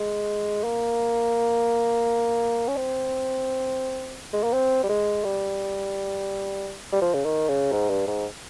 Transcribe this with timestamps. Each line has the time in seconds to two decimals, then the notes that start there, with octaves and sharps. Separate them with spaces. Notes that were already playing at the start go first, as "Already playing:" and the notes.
Already playing: G#3
0.64 A#3
2.68 C#4
2.76 C4
4.33 G#3
4.43 A#3
4.53 C4
4.84 G3
4.89 G#3
5.24 G3
6.92 G3
7.02 F3
7.14 C#3
7.25 D#3
7.49 C#3
7.72 G#2
7.90 G2
8.07 G#2